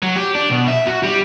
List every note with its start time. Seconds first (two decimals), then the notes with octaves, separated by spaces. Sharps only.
0.03 F#3
0.16 G4
0.35 D4
0.50 B2
0.68 E5
0.87 F#4
1.03 G3